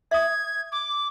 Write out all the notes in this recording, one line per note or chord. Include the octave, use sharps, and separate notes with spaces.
E5 D#6 G#6
D6